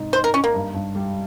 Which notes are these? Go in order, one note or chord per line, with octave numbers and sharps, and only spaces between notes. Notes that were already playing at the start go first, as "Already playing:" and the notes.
Already playing: G#2 C3 D#4
D#4 C5
A#4
C#4 D#4
A#3
G2
G2
G3